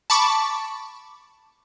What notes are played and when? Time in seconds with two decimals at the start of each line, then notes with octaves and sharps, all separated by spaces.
0.10 A5 B5 C#6 D6